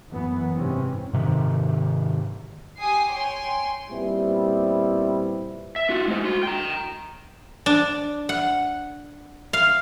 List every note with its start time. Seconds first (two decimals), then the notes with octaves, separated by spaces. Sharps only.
0.11 F#2 E3 B3
0.56 G#2 C3 E3 C4 C#4
1.13 G#2 C3 D#3
2.79 G4 G#5 D#6 C7
3.11 C#5 G5 G#5 C6
3.90 A#2 G3 B3 C4 E4
5.76 E5
5.90 F4 F#4
6.08 G#3 C5
6.25 F#4 C6
6.43 G5 A#5
7.66 D4
8.29 F#5
9.53 F5